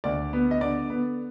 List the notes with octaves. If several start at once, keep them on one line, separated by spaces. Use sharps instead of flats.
D2 D5
B3
D#5
D3 D5
B3